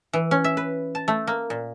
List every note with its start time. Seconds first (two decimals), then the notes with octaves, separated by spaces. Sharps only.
0.13 E3
0.31 C#4
0.44 E5
0.57 B4
0.95 A5
1.08 A3
1.27 A#3
1.50 A#2